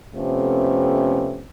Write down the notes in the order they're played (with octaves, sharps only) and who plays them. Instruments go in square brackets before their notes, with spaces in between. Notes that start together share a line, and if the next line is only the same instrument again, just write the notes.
[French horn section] F2 C3 A3 B3 C#4